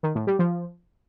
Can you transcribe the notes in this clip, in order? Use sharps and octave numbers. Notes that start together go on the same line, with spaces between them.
D#3
A2
G3
F3